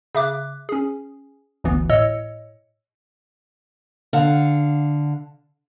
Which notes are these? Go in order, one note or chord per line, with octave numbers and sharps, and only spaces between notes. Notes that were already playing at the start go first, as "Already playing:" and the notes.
C#3 E5 D6 F#6
C#4 G#4
G1 D2 E3 B3
A2 C#5 D#5 E6 C#7
D3 F5 F#5